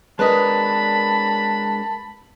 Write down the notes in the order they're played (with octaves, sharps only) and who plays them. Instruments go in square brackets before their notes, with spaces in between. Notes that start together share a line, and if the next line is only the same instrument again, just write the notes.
[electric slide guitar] G#3 D4 A#4 [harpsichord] B4 D#5 [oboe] A5 [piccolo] B5